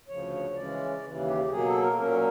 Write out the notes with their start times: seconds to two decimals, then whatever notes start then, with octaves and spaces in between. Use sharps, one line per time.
0.08 D2 C#3 F3 C#5
0.32 C#5
0.51 C#5
0.56 C#3 E3 G#3 C#4 D5
1.03 D#2 C#3 E3
1.26 G4
1.43 G4
1.50 B2 F#3 A#3 G#4
1.66 A4
1.82 A#4
1.98 A#2 F#3 A#3 C#4 A#4